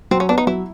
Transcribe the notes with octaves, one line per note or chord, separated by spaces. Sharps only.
F#3 C4
C#4
B3 D4
D#4
F#3 E4